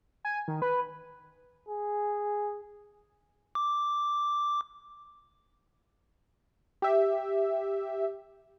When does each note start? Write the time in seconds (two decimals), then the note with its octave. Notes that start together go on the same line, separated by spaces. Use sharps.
0.25 G#5
0.48 D#3
0.62 B4
1.69 G#4
3.55 D6
6.82 G4 E5